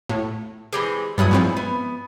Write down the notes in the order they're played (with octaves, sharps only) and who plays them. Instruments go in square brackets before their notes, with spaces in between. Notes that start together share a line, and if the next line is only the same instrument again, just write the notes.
[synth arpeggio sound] A2
[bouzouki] E3 G#3 C4 [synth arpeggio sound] G4
[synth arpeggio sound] G2 F#3 D#6 [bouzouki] B3 E4 G#5
[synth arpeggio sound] G#2 F3 C4
[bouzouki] B3